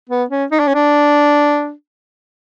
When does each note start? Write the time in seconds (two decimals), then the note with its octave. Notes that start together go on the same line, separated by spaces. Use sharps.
0.10 B3
0.30 C#4
0.51 D#4
0.60 D4
0.67 C#4
0.75 D4